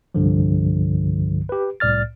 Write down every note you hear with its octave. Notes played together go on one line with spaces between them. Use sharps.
C2 G2 D3 F3
G4 B4
C2 A2 D5 F6 A6